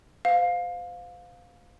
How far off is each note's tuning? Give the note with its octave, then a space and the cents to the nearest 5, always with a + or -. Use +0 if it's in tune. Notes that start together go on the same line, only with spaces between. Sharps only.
C5 -45 F5 +20